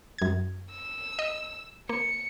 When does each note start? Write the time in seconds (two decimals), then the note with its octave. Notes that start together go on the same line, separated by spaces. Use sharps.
0.18 F#2 G#6
0.71 E6
1.19 D#5
1.89 A#3 C#7